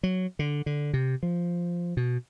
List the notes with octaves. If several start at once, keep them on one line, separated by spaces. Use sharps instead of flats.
F#3
D3
D3
C3
F3
B2